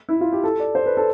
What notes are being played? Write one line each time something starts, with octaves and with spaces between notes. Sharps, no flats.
E4
F4
G4
A4
D5
C5
B4
A4